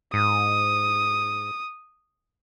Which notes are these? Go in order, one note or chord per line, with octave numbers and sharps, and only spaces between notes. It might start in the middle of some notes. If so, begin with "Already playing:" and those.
G#2 D#6